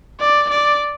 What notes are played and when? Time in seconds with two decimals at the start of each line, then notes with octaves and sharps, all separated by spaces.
0.20 D5
0.50 D5